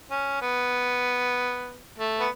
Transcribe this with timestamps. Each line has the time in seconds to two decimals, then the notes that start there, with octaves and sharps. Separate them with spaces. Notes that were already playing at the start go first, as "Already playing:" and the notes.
0.11 C#4
0.41 B3
1.98 A3
2.20 B3